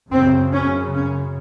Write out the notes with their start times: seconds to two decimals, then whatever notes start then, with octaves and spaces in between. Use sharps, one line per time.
0.11 F#2 C#3 C4
0.52 C#4
0.93 C#4